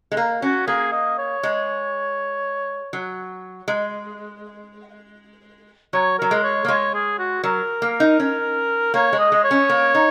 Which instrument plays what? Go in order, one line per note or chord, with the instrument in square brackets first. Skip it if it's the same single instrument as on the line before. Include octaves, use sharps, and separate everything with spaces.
[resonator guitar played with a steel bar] G#3
A#3
[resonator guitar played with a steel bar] C#4 [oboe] F#4
[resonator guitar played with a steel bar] A#3 [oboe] G#4
[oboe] D#5
C#5
[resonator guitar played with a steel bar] G#3
F#3
G#3
[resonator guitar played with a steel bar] F#3 [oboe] C#5
[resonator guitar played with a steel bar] F#3 [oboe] A#4
[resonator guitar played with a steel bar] G#3
[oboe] C#5
[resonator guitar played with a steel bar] A#3
[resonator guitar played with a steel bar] G#3 [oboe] C#5
[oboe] G#4
F#4
[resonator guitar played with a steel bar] F#3 [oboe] A#4
[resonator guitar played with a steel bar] A#3
D#4
C#4
[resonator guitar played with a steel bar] A#3 [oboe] C#5
[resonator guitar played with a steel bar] G#3
[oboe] D#5
[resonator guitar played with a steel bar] G#3
[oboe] C#5
[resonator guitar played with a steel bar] C#4
A#3
D#4